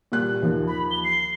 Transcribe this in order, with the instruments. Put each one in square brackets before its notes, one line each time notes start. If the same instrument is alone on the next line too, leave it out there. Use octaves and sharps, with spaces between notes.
[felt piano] A#2 G3 F#6
D#2 F3
[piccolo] B5
G7
C7